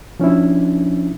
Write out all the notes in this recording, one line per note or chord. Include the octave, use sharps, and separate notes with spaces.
F3 C#4 D4 E4